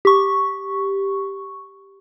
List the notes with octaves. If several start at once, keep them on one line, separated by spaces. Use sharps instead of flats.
G4 C#6